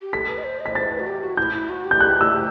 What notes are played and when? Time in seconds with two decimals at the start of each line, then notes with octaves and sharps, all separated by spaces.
0.02 G4
0.13 A4 B6
0.29 B4
0.38 D#5
0.44 C5
0.60 D#5
0.66 B6
0.75 C5 A6
0.91 B4
1.00 F#4
1.07 G4
1.22 F#4
1.37 E4 G6
1.53 E4
1.69 F#4
1.85 G4
1.91 G6
2.00 G4 F#6
2.21 E6